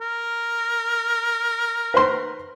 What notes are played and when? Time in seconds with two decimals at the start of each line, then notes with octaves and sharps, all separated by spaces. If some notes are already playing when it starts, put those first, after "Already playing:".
0.01 A#4
1.94 B4 C5 C6